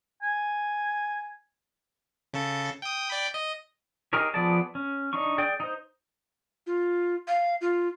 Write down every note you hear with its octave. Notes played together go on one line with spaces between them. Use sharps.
G#5
C#3 A4
G5 D#6
D5 G5 B5
D#5
D#4 G4 G#4 A#4 C#5
F3 B3 G#4 D5 A5
C#4
D4 D#4 C#6
G#4 D5 G5
D#4 C5
F4
F5
F4